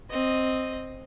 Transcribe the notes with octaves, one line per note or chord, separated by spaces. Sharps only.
C4 D#5